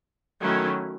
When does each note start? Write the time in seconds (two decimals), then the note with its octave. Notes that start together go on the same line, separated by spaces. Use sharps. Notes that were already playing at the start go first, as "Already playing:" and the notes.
0.41 D#3 F#3 A3 C#4 E4